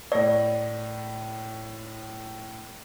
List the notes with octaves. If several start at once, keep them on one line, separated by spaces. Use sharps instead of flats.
A2 D5 A#6